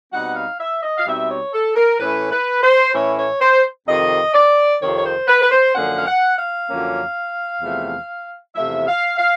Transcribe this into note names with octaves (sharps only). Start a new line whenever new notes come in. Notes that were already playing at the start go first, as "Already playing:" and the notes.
B2 G3 C4 D#4 F#5
F5
E5
D#5
F5
B2 G3 C4 D#4 E5
C#5
A4
A#4
A2 E3 A3 C#4 E4 B4
B4
C5
A2 E3 A3 C#4 E4 C#5
C#5
C5
F2 C3 D#3 D#5
D5
F2 C3 D#3 C#5
C#5
C5
B4
B4
C5
F#2 D3 F3 A#3 C#4 F#5
F5
F#5
F5
F#2 D3 F3 A#3 C#4
E2 C3 F3 A3
E2 C3 F3 A3 E5
F5
F5